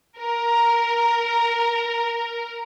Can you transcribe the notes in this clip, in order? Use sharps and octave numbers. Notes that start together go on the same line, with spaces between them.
A#4